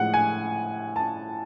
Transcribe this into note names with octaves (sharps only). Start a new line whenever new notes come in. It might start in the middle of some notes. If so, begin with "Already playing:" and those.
Already playing: A2 F3 G#3 F#5
G#5
A5